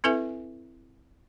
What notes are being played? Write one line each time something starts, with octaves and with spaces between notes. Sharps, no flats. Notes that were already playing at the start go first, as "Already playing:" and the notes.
C4 E4 A4 B4 E5 G#5